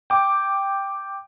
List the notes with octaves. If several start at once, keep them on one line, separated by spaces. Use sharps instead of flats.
G5 D6